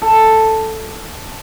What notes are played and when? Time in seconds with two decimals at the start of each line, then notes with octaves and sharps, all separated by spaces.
0.02 A4